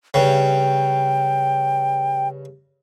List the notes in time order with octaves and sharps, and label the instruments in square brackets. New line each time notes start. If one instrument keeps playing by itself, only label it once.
[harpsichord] G2 C#3 [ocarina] G5